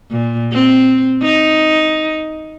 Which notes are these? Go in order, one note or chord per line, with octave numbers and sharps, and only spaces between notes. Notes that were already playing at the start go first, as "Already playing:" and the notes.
A#2
C4
D#4